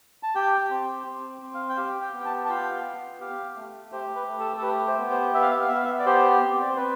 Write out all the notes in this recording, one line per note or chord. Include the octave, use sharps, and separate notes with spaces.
A5
G4 G5
C4
C4
C4
F5
G5
G4 F5
G5
B3
G5
A5
A5
F4 G5
B3
G4 F5
A3
G4 C5
B4
A3
A4
A4
G4 B4
C5
B3
C5
B3 E5
F5
E5
F5
B3 E5
F5
E5
D5
G4 C5
C4
D5
C5
C4 B4